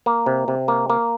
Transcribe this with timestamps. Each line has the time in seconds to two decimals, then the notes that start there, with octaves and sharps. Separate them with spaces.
0.06 A#3
0.26 C3
0.48 C3
0.68 A#3
0.90 A#3